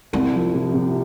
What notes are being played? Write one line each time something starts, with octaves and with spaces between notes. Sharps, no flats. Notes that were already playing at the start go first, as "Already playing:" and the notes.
C2 C4
F3
C3
C3